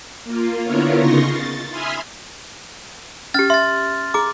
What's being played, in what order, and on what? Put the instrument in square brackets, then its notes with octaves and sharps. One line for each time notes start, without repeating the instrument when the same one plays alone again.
[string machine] A#3 F4
D3 B3 E4 F4 A#4 C#5
C#3 D#4 F4 C6 C#6 A#6
A6
E5 G#5 B5 C6 D#6 F6
[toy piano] C#4 G4 [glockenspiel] F6 A6
[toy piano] E5 [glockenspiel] C6 A6
[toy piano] G#4 A#5 [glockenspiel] D6